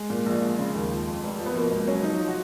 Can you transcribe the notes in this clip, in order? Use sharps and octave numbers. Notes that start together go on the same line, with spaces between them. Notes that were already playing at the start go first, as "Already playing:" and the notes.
Already playing: G#3
A#2
A#1
F3
C#3
D#2
F3
F2
F1
F3
B3
B2 A#3
C#2 A#3
F#3 C#4
F3 D#4
F3
F#4